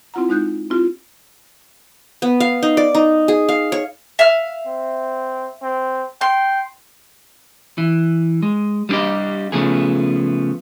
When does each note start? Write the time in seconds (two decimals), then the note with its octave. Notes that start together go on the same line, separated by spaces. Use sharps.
0.14 C4 E4 F4 F#5 A#5
0.29 G#3 D#4 F#6 G6
0.70 C4 E4 F4 G4
2.22 B3
2.40 F5
2.63 D#4
2.77 D5
2.95 D#4
3.28 G#4
3.49 F5
3.72 C#5
4.19 E5 F5 F6
4.67 C4
5.62 C4
6.21 G5 C6
7.78 E3
8.42 G#3
8.89 G3 B3 D4 G4 D#5
9.52 C#3 F3 A3 B3 G#4